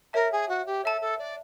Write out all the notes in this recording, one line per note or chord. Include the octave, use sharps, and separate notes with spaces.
A#4 C#5 E5 A5
G#4
F#4
G4
A4 C#5 E5 A5
A4
D5